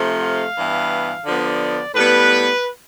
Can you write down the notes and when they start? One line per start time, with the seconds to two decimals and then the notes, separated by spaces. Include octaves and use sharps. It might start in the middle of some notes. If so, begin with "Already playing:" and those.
Already playing: C3 F3 A3
0.24 F5
0.58 G2 E3 B3
1.26 D3 F3 B3 D5
1.94 A2 G3 B3 B4